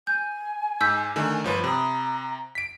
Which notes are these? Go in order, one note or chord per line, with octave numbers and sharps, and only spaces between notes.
G#5 G6
G#2 E6 G6 B6
D3 D#3 A3
G1 F3 B4 C#5
C3 A#5 B5 D#6
B6 D7